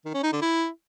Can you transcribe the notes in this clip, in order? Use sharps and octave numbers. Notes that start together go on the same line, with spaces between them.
D#3
C#4
D#4
D3
E4